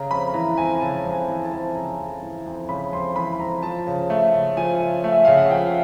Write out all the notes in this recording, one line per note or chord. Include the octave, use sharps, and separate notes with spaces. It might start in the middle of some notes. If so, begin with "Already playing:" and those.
Already playing: C#3 A#5
F2 B5
E3 A#5
F2 G#5
C#3 A5
F2
G#5
E3
A5
F2
C#3 A#5
F2
E3
F2
C#3 B5
F2 C6
E3 B5
F2 A#5
F3 A5
C#3
A3
C#3
F3 G#5
C#3
A3
E5
C#3 F5
F#5
F3 G5